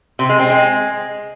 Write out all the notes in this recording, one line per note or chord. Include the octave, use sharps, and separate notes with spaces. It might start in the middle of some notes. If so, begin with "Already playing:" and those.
C3
G#3
C4
G#3